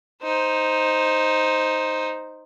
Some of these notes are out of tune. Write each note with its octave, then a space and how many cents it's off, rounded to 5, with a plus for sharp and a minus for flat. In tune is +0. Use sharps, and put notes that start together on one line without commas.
D#4 +0 C5 +0